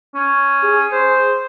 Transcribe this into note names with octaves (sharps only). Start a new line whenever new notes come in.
C#4
G#4
C5